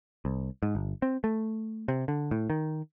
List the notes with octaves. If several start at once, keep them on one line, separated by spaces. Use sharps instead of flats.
C2
G#2
G1
C4
A3
C3
D3
A2
D#3